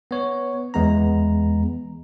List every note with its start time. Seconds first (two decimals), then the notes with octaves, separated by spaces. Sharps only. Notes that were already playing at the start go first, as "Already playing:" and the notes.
0.11 B3 C#5
0.74 E2 G#3 B3 A#5